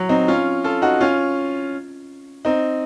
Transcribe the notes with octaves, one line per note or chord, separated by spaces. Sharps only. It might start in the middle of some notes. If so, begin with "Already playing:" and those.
Already playing: F#3
C4 D#4
C#4 F4
F4 A4
D#4 F#4
C#4 F4
C4 D#4